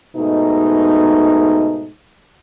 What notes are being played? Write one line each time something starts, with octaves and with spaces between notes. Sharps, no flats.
G#2 B2 A3 D#4